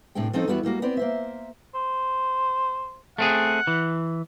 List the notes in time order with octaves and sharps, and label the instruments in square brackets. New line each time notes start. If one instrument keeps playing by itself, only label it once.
[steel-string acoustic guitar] A2 C3 D4 G#4 G5
F3 C4 C#4 D#4 A4 D#5
E2 G3 B3 E4 F#4 F#5
G3 G#3 A#3 F#4
B3 C4 D5
A#3 C5 E5
[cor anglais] C5
[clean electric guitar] A3 C4 G#4 [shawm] F#5
[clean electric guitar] E3